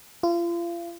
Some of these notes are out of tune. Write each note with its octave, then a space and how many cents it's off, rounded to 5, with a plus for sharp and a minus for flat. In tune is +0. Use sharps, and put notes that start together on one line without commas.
F4 -35